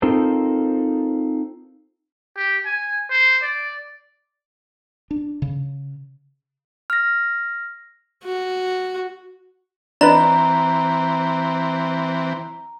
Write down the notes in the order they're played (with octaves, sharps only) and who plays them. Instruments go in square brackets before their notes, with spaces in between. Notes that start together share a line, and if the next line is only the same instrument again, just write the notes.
[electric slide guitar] C4 D#4 F4 A4 A#4 C5
[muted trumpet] G4
G#5
C5
D5
[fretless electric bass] D4
C#3
[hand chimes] F6 A#6
[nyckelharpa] F#4
[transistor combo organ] E3 C4 [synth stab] D4 D#4 B4 [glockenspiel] A#5